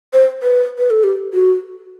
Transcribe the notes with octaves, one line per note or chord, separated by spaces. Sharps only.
C5
B4
B4
A4
G4
F#4